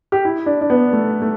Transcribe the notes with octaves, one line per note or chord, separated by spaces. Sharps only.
G4
E4
D4
D4
B3
A3
A3